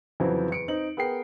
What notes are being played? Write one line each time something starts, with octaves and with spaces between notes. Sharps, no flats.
F2 C#3 E3 F#3 C4
E2 C#7 D7
C4 D#4 F#7
B3 G#4 A#4 G5 C7